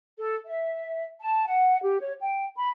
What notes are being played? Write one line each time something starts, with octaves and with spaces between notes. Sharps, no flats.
A4
E5
A5
F#5
G4
C#5
G5
B5